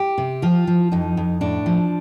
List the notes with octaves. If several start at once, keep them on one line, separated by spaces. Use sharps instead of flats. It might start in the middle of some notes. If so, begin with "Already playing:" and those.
Already playing: G4
C3
F3 F4
F3
F2 D#4
F2
A2 D4
F3